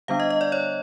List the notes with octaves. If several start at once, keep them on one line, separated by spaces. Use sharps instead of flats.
D3 G3 B3 D4 F5
D#5
D#5
D5
C#5